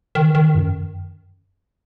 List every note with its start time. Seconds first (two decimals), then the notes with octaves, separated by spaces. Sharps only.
0.15 D#3
0.35 D#3
0.55 F#2